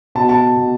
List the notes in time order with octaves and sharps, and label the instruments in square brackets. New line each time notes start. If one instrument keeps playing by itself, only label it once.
[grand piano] B2 A5
A5
B2